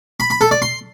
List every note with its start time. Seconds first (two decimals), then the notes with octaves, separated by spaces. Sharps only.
0.20 B5
0.30 B5
0.41 A4
0.51 D5
0.62 C6